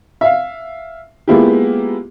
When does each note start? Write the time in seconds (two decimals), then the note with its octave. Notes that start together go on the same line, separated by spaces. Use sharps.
0.21 E5 F5
1.28 G#3 A#3 B3 E4 F4 G4